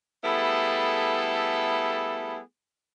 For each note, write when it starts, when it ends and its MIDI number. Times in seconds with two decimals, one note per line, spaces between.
0.24 2.39 55
0.24 2.39 57
0.24 2.39 59
0.24 2.39 64
0.24 2.39 68
0.24 2.39 69